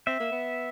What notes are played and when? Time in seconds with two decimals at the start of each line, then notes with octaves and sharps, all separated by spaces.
0.07 C4 E5
0.20 A#3
0.32 B3